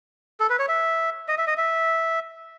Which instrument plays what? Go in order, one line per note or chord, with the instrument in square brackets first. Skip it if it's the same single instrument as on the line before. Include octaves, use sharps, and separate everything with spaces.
[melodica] A4
B4
C#5
E5
D#5
E5
D#5
E5